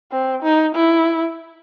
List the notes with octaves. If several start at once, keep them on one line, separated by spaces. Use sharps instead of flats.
C4
D#4
E4